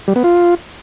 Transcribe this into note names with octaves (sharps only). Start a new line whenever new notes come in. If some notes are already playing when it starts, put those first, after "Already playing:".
G3
B3
F4